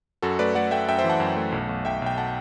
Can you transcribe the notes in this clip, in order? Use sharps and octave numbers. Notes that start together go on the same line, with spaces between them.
F#2 F#4 A4
A3 B4 D5
A3 D5 F#5
A3 E5 G5
F#2 E5 G5
C5 E5
E3
F#5 A5
F#2
A3
B1
B1
B1 E5 G5
B1 G5
F#5 A5